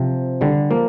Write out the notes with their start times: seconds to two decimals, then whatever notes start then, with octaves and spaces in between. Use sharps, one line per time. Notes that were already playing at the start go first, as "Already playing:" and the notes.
Already playing: C3 F3
0.41 D3 G3
0.70 F3 A#3